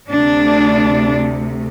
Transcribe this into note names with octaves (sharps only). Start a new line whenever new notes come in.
D2 C3 A3 D4